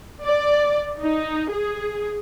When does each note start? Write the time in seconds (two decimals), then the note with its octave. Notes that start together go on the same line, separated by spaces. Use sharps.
0.23 D5
1.02 D#4
1.50 G#4